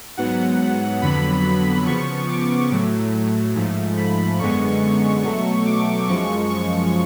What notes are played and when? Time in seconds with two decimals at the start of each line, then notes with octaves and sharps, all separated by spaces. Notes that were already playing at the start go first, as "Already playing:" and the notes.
0.17 G#2 F#3 B3 F#5
1.01 F2 D3 F#3 B3 B5
1.86 C#3 F3 B3 C#6
2.28 D6
2.70 A2 F#3 A3
3.55 G#2 F3 A3
3.97 B5
4.39 F#2 D3 G#3 B3 C#6
5.23 B2 F#3 A3
5.66 D6
6.07 F#2 F3 G#3 C#6
6.49 C#6